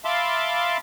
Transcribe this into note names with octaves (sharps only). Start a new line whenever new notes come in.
E5 F5 A5 B5 C6 D6